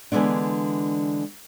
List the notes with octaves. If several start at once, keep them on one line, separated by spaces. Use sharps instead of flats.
D3 E3 G#3 A3 B3 D4